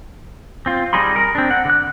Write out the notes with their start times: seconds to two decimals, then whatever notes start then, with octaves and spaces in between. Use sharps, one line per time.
0.66 C4 F4
0.93 G3 D#4 G#4 B5 C6
1.16 A#4
1.35 C4 D4
1.51 F#5
1.65 D3 F#6